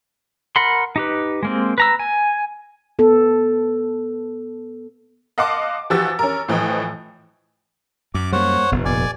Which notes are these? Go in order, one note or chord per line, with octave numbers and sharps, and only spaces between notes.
A#4 F#5 B5 C6
D#4 G4 B4
G#3 A#3 C4
B4 A#5 E6
G#5
B3 A4
D#5 F5 F#5 A5 C6 D6
E3 F3 F#4 G4 E6 A6
C#4 A#4
A2 E3 F3 D#5 G5
F#2 D6
G3 A#3 C5 C#5 F#5
F1 F2 B2 B3
D#1 A#2 B3 D5 G#5